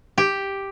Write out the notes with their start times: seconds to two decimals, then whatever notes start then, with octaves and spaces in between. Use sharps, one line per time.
0.18 G4